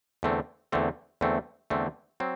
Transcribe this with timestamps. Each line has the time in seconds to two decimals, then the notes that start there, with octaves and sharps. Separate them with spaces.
0.23 E2 D3 A3 C4
0.72 E2 D3 A3 C4
1.21 E2 D3 A3 C4
1.70 E2 D3 A3 C4
2.20 F#3 C4